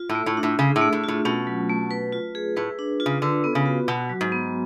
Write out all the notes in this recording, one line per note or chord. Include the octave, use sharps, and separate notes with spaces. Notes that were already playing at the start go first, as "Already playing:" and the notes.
Already playing: F4
A2
A3
A2
D4
A2
C#3 G#4
A2
A3
A2
A2 F4
B2 C#4
F#3
A3
B4
F4
G#4
A2 B4
D4
F4
C#3
D3 B4
B3
C#3
F#4
B2 F#4
F#3
G#2
B3